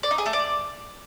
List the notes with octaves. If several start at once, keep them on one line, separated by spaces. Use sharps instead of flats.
D5
D#4
G#4
A3
D5